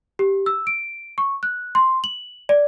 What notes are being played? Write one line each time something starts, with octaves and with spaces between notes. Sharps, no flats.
G4
E6
D7
C#6
F#6
C6
F#7
D5